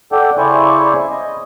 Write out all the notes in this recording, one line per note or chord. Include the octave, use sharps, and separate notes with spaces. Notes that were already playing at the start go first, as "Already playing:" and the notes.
A4 D5 F#5 G5
C#3 E4 C5 D5 G#5 C#6
D#5